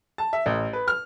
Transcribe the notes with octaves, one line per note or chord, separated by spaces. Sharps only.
A5
E5
A1
B4
F6